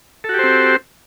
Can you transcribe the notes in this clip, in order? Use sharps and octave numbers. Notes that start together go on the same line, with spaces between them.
C4 F#4 G4 A4 C5